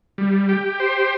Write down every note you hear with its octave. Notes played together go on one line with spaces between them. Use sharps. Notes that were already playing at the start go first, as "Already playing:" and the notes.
G3
G4
C5